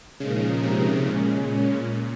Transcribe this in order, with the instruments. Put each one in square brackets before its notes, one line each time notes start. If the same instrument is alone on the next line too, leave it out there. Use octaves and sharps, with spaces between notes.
[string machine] A#2 F3 G#3 D#4 A#4 [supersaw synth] C#3
[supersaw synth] C3
[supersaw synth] A#2 [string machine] C#3 G#3 C#4